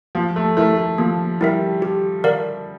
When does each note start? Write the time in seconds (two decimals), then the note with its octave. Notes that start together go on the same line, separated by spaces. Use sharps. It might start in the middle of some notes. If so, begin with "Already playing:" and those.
0.15 F3 A#3
0.36 A3
0.57 A3 E4 A#4 E5
0.77 A3
0.98 F3 A#3
1.41 G3 E4 A#4 E5
1.82 G4
2.24 A#4 D5 F5